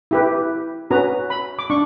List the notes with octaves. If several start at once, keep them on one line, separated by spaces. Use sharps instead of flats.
E4 G4 B4
C#4 F#4 B4 A#5
B5
D6
D4 C#6